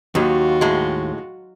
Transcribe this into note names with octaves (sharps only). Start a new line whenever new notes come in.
D#2 F#3 D#4 F4 F#4
A2 G#3